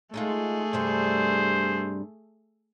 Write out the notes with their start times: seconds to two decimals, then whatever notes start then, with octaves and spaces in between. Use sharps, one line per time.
0.14 G#3 A3 D#4 F4 G#4
0.73 G2 C3 G3 C5